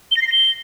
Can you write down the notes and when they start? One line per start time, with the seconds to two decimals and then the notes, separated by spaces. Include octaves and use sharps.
0.11 G7
0.17 A#6
0.22 C7
0.27 A#6
0.32 G7